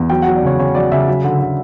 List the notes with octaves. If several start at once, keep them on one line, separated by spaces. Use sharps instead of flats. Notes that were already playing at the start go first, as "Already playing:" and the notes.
Already playing: E2
F#3 G5
F#3 F#5
D5
C#3 C#5
C#3 C#5
F#3 D5
C#3 E5
F#3
D3
D3